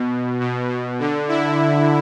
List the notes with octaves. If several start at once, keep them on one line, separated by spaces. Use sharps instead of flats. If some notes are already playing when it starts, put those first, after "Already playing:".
Already playing: B2
B2
B2
D3
E4